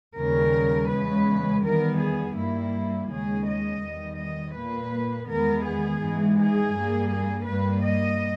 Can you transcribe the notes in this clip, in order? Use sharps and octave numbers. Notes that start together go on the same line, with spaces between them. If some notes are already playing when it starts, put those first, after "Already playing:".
D#2 C#3 G3 A#4
E2 C#3 G#3 B4
E2 D#3 G3 B3 A#4
G#4
G2 G3 A#3 E4
D#2 C#3 G#3 G#4
D#5
E2 D#3 G3
D#5
A#2 A#3 B4
E2 D#3 G#3 B3 A#4
G#4
G#2 E3 G#3
G#4
G2 G3 A#3
G#4
G2 G3 A#3 B4
D#5